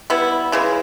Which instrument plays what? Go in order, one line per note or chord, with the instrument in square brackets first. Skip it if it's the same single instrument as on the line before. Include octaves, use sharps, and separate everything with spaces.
[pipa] G3 B3 E4
C#3 E3 G#3